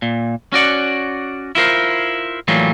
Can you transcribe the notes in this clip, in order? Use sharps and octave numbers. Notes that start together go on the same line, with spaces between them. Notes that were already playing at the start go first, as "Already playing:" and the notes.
A#2
C#4 F#4 D5 F#5
E4 F4 A#4 C5
A2 E3 F#3 G3 A#3 F4